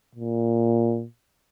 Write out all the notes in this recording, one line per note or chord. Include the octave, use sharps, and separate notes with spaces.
A#2